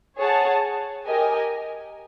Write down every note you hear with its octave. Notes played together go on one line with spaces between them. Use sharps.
G#4 C#5 F#5 A5
G4 A#4 D#5 G#5